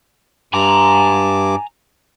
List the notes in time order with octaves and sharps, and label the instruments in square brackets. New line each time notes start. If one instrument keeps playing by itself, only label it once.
[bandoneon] G2 D6 [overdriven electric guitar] G#5 A#5